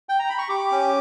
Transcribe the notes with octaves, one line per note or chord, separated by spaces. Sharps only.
G5
A#5
B5
C#6
G4 D6
C#4